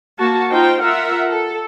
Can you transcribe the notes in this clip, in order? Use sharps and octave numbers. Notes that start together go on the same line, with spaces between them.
A#3 F#4 A5
D#4 F4 C5 G5
F4 A#4 E5 F#5
A4